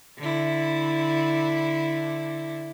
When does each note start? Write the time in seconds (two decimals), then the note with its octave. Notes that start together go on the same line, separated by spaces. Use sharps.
0.19 D3 E4